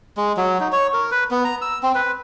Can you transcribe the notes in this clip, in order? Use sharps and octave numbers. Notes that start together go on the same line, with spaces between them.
G#3
F#3
D#4
C#5
A#4
B4
B3
A#5
E6
C4
B4